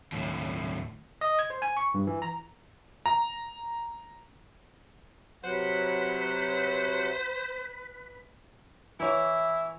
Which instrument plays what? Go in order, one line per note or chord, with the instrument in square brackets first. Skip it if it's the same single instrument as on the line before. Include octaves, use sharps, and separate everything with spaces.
[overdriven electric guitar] D#2 A2
[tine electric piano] D#5
G#6
C5
G#5
C#6
G2
E3
A#5
[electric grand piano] A#5
[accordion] C3 F#3 F#5 [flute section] B4 [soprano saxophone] C5
[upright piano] E3 C#5 [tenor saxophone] E4